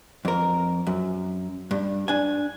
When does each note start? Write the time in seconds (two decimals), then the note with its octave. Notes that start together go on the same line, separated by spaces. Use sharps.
0.25 F2 A#4
0.87 F#2
1.71 G2
2.08 D4 G#5